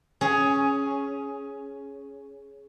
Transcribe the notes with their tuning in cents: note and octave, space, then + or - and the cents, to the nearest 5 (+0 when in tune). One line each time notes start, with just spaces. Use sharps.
C#4 +0 G#4 +10